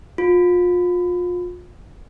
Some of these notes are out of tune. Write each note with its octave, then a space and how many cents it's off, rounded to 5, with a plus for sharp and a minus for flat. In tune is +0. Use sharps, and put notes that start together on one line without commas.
F4 +30